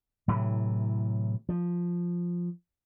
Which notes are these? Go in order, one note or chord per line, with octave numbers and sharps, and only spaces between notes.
A2 C3 E3 F#3
F3